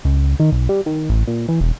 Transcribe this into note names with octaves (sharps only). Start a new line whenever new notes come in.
C#2
D#3
B1
G3
D#3
A1
A#2
E3
E1